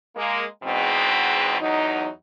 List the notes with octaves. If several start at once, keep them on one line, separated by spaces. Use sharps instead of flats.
G#3 A#3
E2 G#2 B2 G#3 C4
E2 F#3 D#4